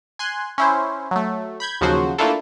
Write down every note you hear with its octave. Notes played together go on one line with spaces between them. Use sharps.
G#5 C6 F#6
C#4 E4 C5
F#3 A3
B5 G6 G#6
D#2 C#3 F3 F#3 F#4 C5
A3 A#3 D4 E4 F4 A4